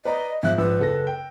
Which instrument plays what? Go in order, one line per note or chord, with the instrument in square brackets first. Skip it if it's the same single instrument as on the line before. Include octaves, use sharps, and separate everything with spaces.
[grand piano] B4 D5 A#5 [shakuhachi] D#5
[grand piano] G#2 F3 F#6 [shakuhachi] E5
[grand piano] A#1 G#2 E6 [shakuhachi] B4
[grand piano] F#1 A4 A#6
G5